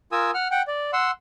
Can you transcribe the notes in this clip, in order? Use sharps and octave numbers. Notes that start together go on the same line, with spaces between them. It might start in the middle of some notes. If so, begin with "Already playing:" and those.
F4 A#4 G#5 D#6 E6
F#5 F6
F#5 G5
D5
F#5 C6 E6